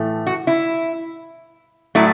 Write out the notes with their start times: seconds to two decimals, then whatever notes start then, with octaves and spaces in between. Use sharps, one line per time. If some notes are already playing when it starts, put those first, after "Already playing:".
Already playing: A2 E3 A3
0.27 F#4
0.47 E4
1.95 A2 F#3 A3 E4